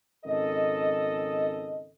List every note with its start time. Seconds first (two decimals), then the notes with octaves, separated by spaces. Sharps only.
0.25 G#1 C#3 A4 D#5